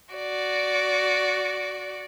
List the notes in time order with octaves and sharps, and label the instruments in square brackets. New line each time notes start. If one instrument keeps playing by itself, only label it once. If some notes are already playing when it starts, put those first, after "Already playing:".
[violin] F#4 D5